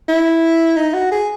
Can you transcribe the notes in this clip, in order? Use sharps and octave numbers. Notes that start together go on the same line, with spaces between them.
E4
D#4
F#4
G#4